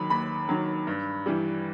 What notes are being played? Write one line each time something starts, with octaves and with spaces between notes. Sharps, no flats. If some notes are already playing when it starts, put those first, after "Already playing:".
Already playing: D#2 D#3 F#3 B5
D#2 B5
D#3 F#3
G2
E3 G3